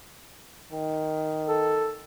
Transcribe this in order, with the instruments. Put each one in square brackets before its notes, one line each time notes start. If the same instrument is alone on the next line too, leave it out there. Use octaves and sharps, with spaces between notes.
[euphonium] D#3
[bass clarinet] A4